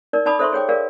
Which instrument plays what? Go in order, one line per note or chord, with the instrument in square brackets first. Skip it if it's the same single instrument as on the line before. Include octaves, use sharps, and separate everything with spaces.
[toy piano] D#4 A#4 D5
D#4 D5 A5 B5 D6 D#6
A4 C5 E5 C6 C#6
G#4 C#5 G5 D6
G#4 A#4 D5 F5